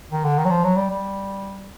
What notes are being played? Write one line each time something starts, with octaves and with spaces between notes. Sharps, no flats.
D#3
D3
D#3
F#3
F3
F#3
G3
G3